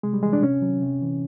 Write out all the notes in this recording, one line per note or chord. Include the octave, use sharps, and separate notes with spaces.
C3 G#3
G3
E3 G#3
D4
C3 C#4
D#3 F#3
C3
E3